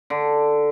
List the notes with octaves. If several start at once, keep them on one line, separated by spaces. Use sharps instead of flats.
D3